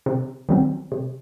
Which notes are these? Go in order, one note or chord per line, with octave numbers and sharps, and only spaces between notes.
C3
D#3 F#3 C4
C3